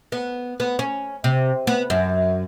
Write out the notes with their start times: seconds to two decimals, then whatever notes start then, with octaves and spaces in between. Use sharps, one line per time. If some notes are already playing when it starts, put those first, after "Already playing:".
0.12 B3
0.60 B3
0.79 C#4
1.24 C3
1.67 B3
1.90 F#2